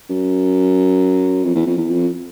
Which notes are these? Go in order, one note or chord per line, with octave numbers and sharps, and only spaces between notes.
F#2
F2
E2
F2
E2
F2